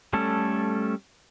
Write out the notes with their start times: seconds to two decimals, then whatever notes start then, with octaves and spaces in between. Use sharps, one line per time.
0.13 G3 A3 C#4 A4